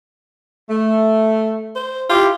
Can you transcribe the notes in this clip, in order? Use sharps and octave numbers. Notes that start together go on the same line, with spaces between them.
A3
C5
E4 F4 G4